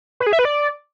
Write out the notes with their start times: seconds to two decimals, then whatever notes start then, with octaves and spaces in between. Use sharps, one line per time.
0.20 B4
0.27 G#4
0.33 E5
0.39 B4
0.45 D5